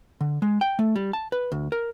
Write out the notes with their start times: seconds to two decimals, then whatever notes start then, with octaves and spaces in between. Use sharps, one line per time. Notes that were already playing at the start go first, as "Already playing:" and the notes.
0.21 D3
0.42 G#3
0.61 G5
0.79 A3
0.96 G3
1.13 A5
1.32 B4
1.52 D2
1.72 A#4